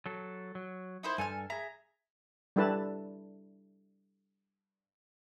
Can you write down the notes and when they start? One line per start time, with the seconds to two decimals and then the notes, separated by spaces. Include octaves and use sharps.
0.06 F#3 A4
0.55 F#3
1.03 D#4 E4 C5
1.18 G2 A4 G#5 F6
1.50 G#4 E5 A#5
2.56 G3 D4 E4 A4 B4 A5